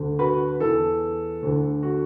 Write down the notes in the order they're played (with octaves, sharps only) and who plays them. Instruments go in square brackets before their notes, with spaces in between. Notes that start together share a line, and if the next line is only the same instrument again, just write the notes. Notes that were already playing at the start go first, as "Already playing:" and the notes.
Already playing: [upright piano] D2 D3
F#4 B4
E2 E3 A4
D2 D3
F#4